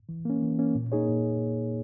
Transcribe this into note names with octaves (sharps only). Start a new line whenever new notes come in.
E3
A#3 C#4
E3
A#3 C#4
A#2
A#3 D#4 G#4 C#5
A#2